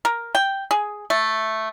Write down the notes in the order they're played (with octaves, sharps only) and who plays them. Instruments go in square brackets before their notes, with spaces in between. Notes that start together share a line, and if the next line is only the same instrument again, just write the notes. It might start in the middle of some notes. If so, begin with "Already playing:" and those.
[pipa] A#4
G5
G#4
A3